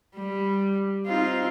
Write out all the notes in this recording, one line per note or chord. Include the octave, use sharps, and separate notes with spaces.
G3
C4 D#4 F4